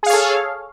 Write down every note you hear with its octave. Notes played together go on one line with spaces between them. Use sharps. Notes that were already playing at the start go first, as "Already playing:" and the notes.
G#4 A4 C#5 F5